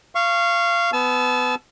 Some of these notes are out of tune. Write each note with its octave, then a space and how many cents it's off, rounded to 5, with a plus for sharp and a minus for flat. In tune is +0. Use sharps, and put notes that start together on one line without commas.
F5 -20 C#6 -5
B3 +20 A5 -35 E6 +20